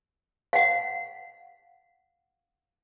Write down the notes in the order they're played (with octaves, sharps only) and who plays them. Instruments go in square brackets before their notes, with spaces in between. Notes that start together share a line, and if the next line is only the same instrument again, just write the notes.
[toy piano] F5 F#5